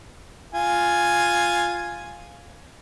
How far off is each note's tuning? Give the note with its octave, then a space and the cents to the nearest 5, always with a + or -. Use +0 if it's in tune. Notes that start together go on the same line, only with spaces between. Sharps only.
F4 +0 G#5 +0